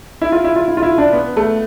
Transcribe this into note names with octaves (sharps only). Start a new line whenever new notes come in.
E4
F4
E4
F4
E4
F4
E4
D4
B3
A3